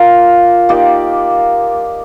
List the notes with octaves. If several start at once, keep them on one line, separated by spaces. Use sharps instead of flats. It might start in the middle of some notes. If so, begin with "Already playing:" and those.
Already playing: A#3 F4 A#4
A#3 D#4 G4 D5